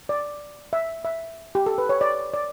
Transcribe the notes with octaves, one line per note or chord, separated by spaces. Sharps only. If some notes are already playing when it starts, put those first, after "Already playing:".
D5
E5
E5
G4
A4
B4
C#5
D5
D5